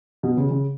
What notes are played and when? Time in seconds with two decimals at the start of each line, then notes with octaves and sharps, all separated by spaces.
0.23 B2
0.37 C#3
0.51 C#3